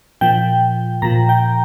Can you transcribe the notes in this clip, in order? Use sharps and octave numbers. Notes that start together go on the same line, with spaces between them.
A#2 F3 G5
A#2 F3 A#5
G5